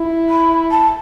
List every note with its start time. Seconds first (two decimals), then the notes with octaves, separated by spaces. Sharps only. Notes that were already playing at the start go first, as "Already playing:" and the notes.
Already playing: E4
0.29 B5
0.71 A5